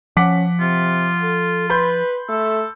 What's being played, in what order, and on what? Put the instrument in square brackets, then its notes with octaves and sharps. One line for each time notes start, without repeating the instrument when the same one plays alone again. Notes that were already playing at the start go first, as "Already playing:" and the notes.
[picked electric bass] F3 [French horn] C#4 [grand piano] F#5 D6 B6
[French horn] C3 [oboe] F4
[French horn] A4
[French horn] B4 [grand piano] B5 C6 G6
[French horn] A3 [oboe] A4